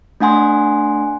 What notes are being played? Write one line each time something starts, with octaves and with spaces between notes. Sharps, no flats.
A3 D4 F#5 G#5 C6